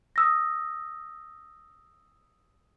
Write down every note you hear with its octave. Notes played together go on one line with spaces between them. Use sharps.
D#6 E6 A#6